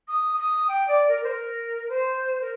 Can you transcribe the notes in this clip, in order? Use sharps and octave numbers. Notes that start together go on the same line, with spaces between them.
D#6
D#6
G5
D5
A#4
C5
A#4
C5
A#4